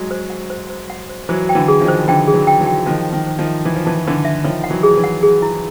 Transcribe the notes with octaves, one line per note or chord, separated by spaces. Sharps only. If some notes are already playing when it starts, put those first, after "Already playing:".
Already playing: F#3 G#3
C5
F#5
C5
C5
F#5
C5
E3 F#3 C5
G5
D3 E3
G#4
D#3 F3
C5
D3 E3 G5
G#4
E3 F#3
G5
E3 F#3
G5
D#3 F3 C5
A5
D#3
C5
D#3 F3
E5
E3 E5
F3
E3 A5
F3
D3 E3 C#6
E5
D#3 F3 C#5
F#5
E3 F#3
G#4
E3 F#3
F#5
G#4
E4